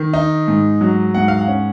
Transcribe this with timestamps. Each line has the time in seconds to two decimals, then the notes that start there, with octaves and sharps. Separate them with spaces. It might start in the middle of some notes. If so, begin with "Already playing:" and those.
Already playing: D#3
0.13 D#4
0.48 G#2
0.81 F#3
1.14 G#2 F#5
1.28 F5
1.41 F#5
1.48 C#4